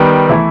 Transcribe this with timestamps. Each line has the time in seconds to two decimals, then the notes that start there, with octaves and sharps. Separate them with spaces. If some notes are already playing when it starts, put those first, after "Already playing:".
Already playing: D#3 G3 B3
0.29 E3 A3 E4